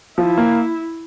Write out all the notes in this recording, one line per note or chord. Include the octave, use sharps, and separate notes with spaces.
F3 E4
A#3